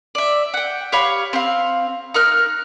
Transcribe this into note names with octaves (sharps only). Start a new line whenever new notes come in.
D5 E5
F#5 G5
G4 C#5 F5 B5
C4 F5
D#4 A#4 F6 F#6